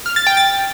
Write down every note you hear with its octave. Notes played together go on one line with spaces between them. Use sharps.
F6
A6
G5
A6